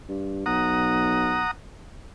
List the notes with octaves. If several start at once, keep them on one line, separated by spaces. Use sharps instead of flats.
G2
B1 F#5 A#5 D#6